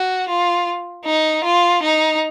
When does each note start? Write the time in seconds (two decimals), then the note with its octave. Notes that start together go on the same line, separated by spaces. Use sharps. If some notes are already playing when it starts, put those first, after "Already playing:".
Already playing: F#4
0.28 F4
1.05 D#4
1.44 F4
1.82 D#4